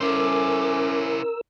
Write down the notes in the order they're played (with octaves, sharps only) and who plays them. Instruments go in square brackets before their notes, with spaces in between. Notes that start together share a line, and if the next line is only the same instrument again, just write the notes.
[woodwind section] C#4 [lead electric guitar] E4 C5 [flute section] A4 D6 [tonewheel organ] A#4 E6